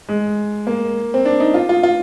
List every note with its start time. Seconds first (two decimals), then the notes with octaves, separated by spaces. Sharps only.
0.09 G#3
0.67 A#3
1.14 C4
1.25 D4
1.40 D#4
1.54 F4
1.69 F4
1.83 F4